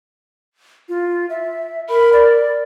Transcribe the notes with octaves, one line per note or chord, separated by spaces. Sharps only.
F4
E5
A#4 B5
D5